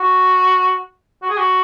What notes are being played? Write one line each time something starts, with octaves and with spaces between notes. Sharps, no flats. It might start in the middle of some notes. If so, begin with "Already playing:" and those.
Already playing: F#4
F#4
G#4
F#4